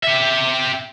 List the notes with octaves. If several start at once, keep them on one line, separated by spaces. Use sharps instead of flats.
G4 E5